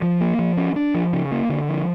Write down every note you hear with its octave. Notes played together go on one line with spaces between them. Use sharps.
F3
A#3
F3
C#4
D4
F3
C#3
A#3
D3
F3